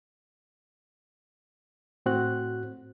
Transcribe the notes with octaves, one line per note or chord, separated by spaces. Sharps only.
A2 C4 F#4 F#6